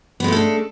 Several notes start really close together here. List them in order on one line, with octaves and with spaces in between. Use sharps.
B3 G#3 A3 A4 D4